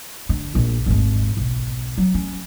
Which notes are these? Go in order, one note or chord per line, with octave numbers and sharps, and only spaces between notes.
D3
A#1 F4
G#1 D#2
B1
F#3
C#4